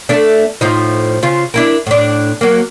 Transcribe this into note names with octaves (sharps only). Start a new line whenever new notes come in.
A3 D4
A2 F3 D#4
C#3 F4
D4 E4 A#4
A2 D4
F#3 A#3